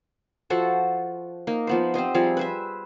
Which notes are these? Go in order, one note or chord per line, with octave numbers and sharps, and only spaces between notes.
F3 F#4 A4 C5
A#3 D#4
F3 B3 C5
C4 G4 C5 D#5
F3 G3 C4 G#4
B4 C5 E5